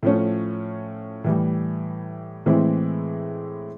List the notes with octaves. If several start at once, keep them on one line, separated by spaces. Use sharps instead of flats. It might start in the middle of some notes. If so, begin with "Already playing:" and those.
A2 F3 A3 C#4
A2 E3 G3
A2 E3 G#3 C4 E4